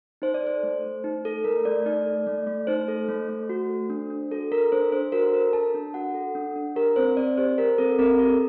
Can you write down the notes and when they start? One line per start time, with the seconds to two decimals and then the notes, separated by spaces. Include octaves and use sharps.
0.22 D#4 C5
0.34 D5
0.43 A4 C5
0.63 A3
0.84 A3
1.04 D#4
1.25 A4
1.44 A3 A#4
1.65 A3 D5
1.86 D#4 D5
2.06 A4
2.27 A3
2.47 A3
2.67 D#4 C5
2.88 A4
3.08 A3
3.29 A3
3.49 F#4
3.70 A4
3.90 D4
4.10 D4
4.31 F#4 A4
4.52 A4 A#4
4.72 D4 C5
4.92 D4 C5
5.12 F#4 A#4
5.33 A4 A#4
5.53 D4 A5
5.74 D4
5.94 F#4 F#5
6.14 A4
6.35 D4
6.56 D4
6.76 G4 A#4
6.96 C4 C5
7.17 C4 D5
7.37 G4 C5
7.58 G4 A#4
7.78 C4 A4
7.99 C4 A#4
8.19 G4 A4